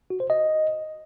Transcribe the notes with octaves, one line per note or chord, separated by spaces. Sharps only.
F#4
C5
D#5